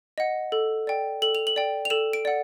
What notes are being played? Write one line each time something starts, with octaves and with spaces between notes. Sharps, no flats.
D#5 F#5
A4
D5 G5
A4 F#7
F7
F#7
D5 G5
F7
A4 E7
D7
D5 F#5